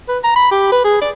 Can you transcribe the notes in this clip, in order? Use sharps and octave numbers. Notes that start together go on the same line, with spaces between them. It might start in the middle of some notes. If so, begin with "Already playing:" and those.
B4
A#5
B5
G4
B4
G#4
D5